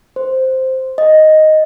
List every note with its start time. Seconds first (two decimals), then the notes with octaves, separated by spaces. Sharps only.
0.16 C5
0.98 D#5